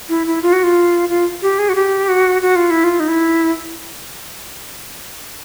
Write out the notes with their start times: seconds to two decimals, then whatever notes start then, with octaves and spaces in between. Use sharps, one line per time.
0.09 E4
0.27 E4
0.42 F4
0.53 F#4
0.63 F4
1.09 F4
1.42 G4
1.59 G#4
1.69 F#4
1.75 G4
2.09 F#4
2.42 F#4
2.56 F4
2.70 E4
2.84 F4
3.00 D#4
3.08 E4